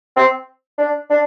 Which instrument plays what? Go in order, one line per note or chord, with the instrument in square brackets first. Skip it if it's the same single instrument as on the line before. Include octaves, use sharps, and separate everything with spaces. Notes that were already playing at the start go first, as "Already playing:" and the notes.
[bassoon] C4
D4
D4